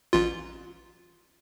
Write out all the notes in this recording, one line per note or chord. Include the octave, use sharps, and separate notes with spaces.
A1 F4